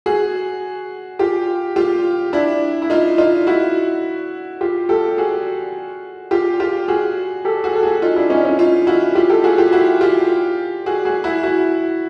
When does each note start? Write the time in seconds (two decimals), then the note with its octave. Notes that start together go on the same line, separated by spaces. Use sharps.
0.06 F#4 G#4
1.19 F4 G4
1.76 F4 G4
2.33 D4 E4
2.82 E4
2.90 D#4 F4
3.18 D#4 F4
3.47 E4 F#4
4.61 F4 G4
4.89 G4 A4
5.18 F#4 G#4
6.31 F4 G4
6.60 F4 G4
6.88 F#4 G#4
7.45 G4 A4
7.64 F#4 G#4
7.76 A4
7.83 F#4 G#4
8.02 D#4 F4
8.16 D4 E4
8.30 C#4 D#4
8.45 C#4 D#4
8.59 D#4 F4
8.87 E4 F#4
9.15 F4 G4
9.30 G4 A4
9.44 F#4 G#4
9.58 F4 G4
9.73 E4 F#4
10.01 F4 G4
10.86 F#4 G#4
11.05 F#4 G#4
11.24 E4 F#4
11.43 E4 F#4